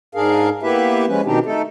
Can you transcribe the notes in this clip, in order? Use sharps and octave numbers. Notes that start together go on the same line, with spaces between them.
G#2 D4 G#4 A#4 F5
A#3 B3 E4 G4 B4 E5
F3 G#3 C#4 B4
B2 D#3 C4 D4 D#4 G4
A3 D#4 A4